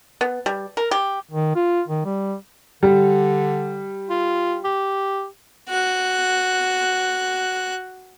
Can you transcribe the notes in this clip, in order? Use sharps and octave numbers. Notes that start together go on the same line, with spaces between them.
B3
G3
A#4
G4
D#3
F4
D#3
G3
D3 G3
F4
G4
F#4 F#6